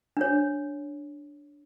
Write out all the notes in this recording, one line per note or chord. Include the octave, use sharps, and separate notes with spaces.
D4 C#5